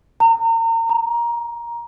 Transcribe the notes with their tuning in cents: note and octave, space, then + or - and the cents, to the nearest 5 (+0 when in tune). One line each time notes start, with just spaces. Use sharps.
A#5 -35
A#5 +15